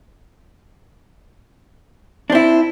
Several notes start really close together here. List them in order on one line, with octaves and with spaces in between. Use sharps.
D4 C4 E4